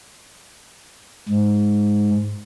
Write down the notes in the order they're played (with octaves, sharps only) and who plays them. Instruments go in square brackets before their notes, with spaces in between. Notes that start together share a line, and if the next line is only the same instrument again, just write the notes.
[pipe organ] G#2